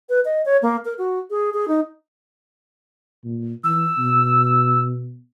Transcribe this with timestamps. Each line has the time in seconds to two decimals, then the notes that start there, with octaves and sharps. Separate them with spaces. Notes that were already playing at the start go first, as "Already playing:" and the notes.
0.09 B4
0.25 D#5
0.46 C#5
0.62 A#3
0.85 A#4
0.98 F#4
1.30 G#4
1.54 G#4
1.68 D#4
3.25 A#2
3.64 E3 E6
3.98 B2